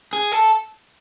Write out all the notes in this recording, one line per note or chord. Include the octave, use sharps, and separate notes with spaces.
G#4
A4